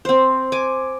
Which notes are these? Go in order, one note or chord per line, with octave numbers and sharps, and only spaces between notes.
C4 C5
G#5 D6